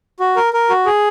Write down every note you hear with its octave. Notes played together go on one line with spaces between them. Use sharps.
F#4
A#4
A#4
F#4
G#4